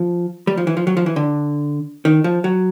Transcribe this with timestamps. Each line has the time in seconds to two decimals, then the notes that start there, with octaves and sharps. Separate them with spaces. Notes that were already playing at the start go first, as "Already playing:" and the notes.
Already playing: F3
0.47 G3
0.57 F3
0.67 E3
0.77 F3
0.87 F#3
0.97 F3
1.06 E3
1.16 D3
2.05 D#3
2.24 F3
2.44 F#3